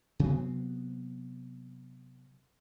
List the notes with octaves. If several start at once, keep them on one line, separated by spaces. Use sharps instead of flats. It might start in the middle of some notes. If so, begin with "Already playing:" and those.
C3 F#3 B3 C4